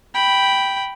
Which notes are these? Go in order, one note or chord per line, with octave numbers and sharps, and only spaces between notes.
G5 B5